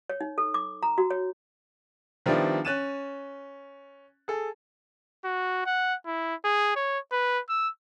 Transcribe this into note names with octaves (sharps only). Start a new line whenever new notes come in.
C#5
D#4
A4
D6
A#5
F#4
C#5
D#3 F3 G3 B3 D4 E4
C#4 F#6 A6 D#7 E7
G#4 A4
F#4
F#5
E4
G#4
C#5
B4
E6